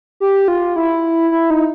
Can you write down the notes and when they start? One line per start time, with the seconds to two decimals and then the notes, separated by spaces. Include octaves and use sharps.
0.20 G4
0.48 F4
0.76 E4
1.32 E4
1.50 D#4